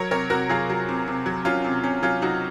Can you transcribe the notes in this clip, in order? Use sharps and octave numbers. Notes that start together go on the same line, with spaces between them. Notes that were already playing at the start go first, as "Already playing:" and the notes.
Already playing: F#3 A#4 C#5
C3 A#4 C#5
C3 F#4 A#4
F#3 F4 G#4
F#3
C3
C3
F#3
F#3 C#4 F4
C3
C3 C#4
F#3 C#4 F4
F#3 D#4 F#4